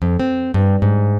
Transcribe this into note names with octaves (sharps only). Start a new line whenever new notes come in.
F2
C4
G2
G#2